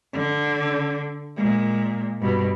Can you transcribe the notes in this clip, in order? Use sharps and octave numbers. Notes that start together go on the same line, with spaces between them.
D3
A#2 G#3
G2 B2